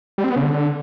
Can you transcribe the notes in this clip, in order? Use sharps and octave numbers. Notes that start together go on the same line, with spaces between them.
G3
C4
B3
C#3
D3